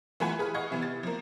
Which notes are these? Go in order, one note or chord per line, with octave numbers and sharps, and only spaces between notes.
E3 A3 F4 B4 F#5 G#5
G#4 B4 F6
D#5 F5 F#5 C#6 G#6
C3 E3 B3
A6
F3 A#3